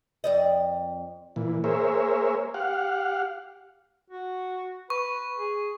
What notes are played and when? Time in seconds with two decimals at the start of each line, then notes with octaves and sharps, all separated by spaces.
0.24 F2 D5 D#5
1.36 A#2 E3
1.64 A#3 G#4 A#4 C5 C#5 E5
2.54 G4 F5 F#5
4.10 F#4
4.90 B4 C#6
5.36 G#4